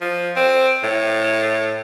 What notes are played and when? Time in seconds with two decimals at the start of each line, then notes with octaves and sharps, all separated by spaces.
0.01 F3
0.36 C4
0.83 A2